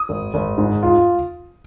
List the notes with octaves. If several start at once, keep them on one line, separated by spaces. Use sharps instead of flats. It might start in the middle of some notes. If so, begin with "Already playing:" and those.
Already playing: D#6
G#1
G#1
G#2
F4